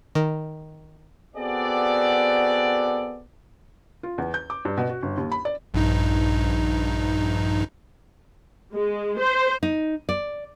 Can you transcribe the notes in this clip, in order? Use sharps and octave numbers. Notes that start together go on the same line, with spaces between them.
D#3
B3 C4 F#4 G#4 A4 D5
F4
E2
G6
D6
G2
B2
F#4
G1
D#2
B5
D5
A#1 G2 D#4
G#3
C5
D#4
D5